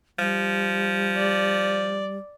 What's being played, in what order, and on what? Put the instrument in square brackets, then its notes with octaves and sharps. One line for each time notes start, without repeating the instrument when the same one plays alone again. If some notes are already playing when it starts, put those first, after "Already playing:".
[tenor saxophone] F3 [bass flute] G3
[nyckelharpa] D5